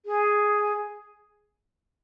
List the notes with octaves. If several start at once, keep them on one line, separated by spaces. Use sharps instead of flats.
G#4